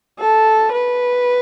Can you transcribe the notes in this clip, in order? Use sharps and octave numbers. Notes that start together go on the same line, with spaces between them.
A4
B4